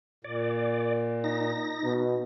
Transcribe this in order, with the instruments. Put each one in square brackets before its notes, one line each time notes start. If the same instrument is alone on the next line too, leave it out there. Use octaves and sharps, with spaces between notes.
[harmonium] A#2 [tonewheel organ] D5
[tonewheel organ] D#4 A#6
[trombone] B2